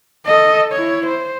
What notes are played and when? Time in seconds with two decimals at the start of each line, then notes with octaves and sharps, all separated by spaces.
0.26 A4 D#5
0.73 E4 C#5
1.06 C5